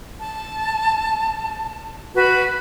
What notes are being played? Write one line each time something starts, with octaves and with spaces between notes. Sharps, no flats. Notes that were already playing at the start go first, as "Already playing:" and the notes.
A5
F#4 B4